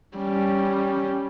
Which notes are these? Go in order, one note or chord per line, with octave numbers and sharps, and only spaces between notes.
G3 C#4